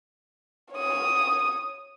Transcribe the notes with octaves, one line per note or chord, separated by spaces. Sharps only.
C#5 D#6